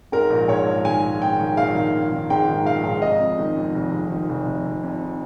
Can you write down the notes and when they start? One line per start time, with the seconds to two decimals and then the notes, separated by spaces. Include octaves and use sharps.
0.12 G#2 A#4
0.30 A#1
0.48 G#2 C#5
0.67 A#1
0.85 D#3 G#5
1.03 A#1
1.21 A#1 G5
1.39 D#3
1.57 A#1 F5
1.75 D#3
1.93 A#1
2.12 D#3
2.30 G#2 G5
2.48 D#3
2.65 A#1 F5
2.84 G#2
3.02 F1 D#5
3.20 F2
3.39 D#3
3.56 F2
3.74 F1
3.92 F1
4.10 D#3
4.29 F1
4.46 F1
4.66 F1
4.83 F2